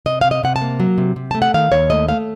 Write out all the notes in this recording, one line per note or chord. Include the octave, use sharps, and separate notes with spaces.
C3 D#5
C3 F5
D#5
C3 F#5
A5
A#3
F#3
C3
C3
A3 A5
F#5
D#3 F5
D#2 C#5
A3 D#5
A3 F5